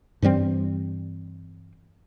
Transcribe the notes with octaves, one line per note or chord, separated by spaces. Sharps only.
G2 E3 G3 C4